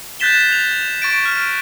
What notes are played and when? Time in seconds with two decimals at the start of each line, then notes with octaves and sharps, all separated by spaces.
0.20 F#6 G6 A6 B6 E7 G7
0.52 F7
1.02 C#6 A6 D7
1.26 F6